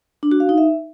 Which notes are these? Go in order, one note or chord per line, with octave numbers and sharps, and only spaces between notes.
D4
F#4
F5
D#4
E5